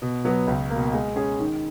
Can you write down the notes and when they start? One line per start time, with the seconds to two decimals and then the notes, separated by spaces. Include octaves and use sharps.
0.02 B2
0.25 F#3 B3
0.47 C#2
0.70 A#3
0.76 B2
0.94 G#3
1.16 C#4 G#4
1.40 D#3